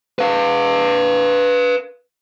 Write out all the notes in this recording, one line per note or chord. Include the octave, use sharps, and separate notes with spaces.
B4 F5